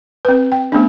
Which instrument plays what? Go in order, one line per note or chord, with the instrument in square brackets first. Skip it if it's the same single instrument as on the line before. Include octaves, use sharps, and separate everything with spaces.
[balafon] C4 B4
G5
A3 B3 C#4 D4